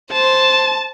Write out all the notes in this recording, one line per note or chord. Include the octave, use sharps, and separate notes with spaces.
C5 A5